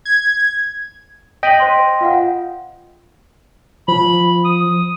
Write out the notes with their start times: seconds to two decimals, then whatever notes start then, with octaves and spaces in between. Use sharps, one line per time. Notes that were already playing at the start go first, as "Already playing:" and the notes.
0.05 G#6
1.43 D#5 G5 B6 D#7 F#7
1.60 C5 C6
2.01 F4 F5 F#5
3.88 F3 B5
4.45 D#6